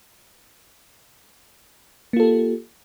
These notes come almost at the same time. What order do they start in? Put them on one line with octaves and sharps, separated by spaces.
A#3 F4 A4 G4